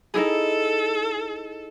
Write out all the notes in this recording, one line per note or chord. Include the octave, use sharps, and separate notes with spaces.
D#4 E4 G#4 A4